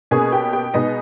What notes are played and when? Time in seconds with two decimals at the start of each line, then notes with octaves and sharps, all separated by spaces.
0.11 B2 A#3 C#4 G#4 G#5
0.32 G4 G5
0.53 G4 G5
0.74 B2 G#3 B3 D#4 D#5